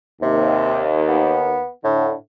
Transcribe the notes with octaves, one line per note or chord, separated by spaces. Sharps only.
D#2 C3
B3
A2 D3